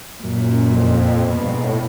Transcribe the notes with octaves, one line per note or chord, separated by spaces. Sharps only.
F#2 A#2
F2
F2 B2
G2
G#2
A2